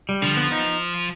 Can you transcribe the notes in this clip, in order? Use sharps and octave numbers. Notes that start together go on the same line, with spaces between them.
G3
D3 F3
B3
D#4